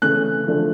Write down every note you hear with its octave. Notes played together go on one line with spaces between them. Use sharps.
C#3 E3 A3 F#6
D3 F3 A3 D4